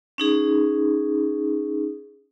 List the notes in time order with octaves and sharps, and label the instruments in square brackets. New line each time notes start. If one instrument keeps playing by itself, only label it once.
[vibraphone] C#4 D#4 G#4